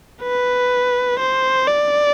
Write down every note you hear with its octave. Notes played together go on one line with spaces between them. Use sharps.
B4
C5
D5